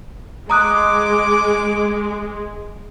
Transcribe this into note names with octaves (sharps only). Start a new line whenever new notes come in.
G#3 A#5 D6 D#6 F#6